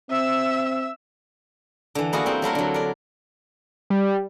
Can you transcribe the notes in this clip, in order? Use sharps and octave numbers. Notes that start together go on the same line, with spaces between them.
C4 E5 E6
D3 E3
A#3 B3 E4 F#4 G#4 A#4
G3 C4
F#3 A3 E4 A#4
D3 F#3
A#4 D5
G3